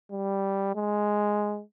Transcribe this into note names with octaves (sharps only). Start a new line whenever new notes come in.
G3
G#3